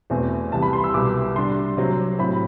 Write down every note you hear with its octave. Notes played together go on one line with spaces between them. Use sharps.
E2 B2 A3 C4
C2 C3 E3 G3 A5
B5
C6
E6
C2 B2 G3 D6
C3 G3 D4 C6
C3 F#3 C4
A2 F#3 C4 B5